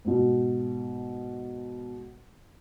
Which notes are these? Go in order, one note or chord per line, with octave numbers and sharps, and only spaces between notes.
G#2 B2